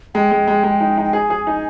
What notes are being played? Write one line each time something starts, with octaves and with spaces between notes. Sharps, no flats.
G#3 G5
G#3
G#3
G#3
D#4
D#4
G5
G#4 G#5
G#4
D#4